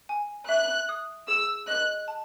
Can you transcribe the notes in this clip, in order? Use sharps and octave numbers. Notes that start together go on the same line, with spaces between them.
G#5
E5 F#6
D#6
G#4 E6
D#5 F#6
A5